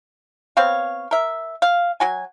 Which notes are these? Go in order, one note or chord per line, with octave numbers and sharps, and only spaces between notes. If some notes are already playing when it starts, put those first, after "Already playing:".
B3 C4 C#5 F5
A#4 E5
F5
F#3 F#4 G#5